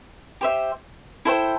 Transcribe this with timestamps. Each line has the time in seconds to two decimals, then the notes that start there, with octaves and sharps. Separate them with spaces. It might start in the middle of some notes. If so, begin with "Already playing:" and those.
0.41 G4 C5 E5
1.25 E4 A4 C5 G5